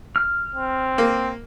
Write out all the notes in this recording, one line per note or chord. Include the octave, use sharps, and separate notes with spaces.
F6
C4
A#3